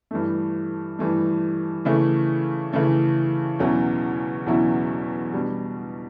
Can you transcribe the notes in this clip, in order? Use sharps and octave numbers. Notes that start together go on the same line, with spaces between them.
G2 E3 A3
G2 E3 A3
C#3 E3 A3 C#4
C#3 E3 A3 C#4
E2 B2 F#3 C#4 E4
E2 B2 F#3 C#4 E4
B2 G3 D4